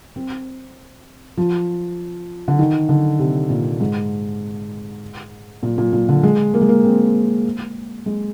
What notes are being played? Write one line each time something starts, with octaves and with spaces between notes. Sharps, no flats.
C4
F3
D3
D#3
D3
C3
A#2
G#2
A#2
A#2
A#2
D3
G#3
A#3
G#3
A#3
C4
G#3